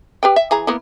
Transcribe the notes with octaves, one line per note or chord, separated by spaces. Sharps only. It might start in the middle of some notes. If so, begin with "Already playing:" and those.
G4 B4 G5
E5
E3 G#4 A#5
A#3 B3 E4